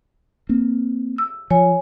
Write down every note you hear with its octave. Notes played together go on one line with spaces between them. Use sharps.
A#3 C4
E6
F3 C#5 G#5